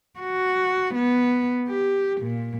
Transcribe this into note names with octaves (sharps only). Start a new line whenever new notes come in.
F#4
B3
G4
A#2